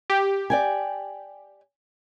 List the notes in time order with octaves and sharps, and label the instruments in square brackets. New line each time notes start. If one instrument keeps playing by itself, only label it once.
[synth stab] G4
[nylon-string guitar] D5 G5 G#5